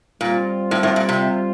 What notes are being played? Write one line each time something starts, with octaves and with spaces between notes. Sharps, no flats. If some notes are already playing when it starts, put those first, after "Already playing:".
A#2 G3 C4 F4
A2
A2
A#2
C3